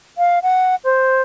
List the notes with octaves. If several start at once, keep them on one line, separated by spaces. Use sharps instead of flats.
F5
F#5
C5